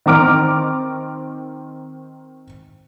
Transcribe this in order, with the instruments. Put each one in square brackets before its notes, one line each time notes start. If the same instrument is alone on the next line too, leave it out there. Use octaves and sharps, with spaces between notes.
[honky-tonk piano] D#3 C4 A#5 D6 F6 D7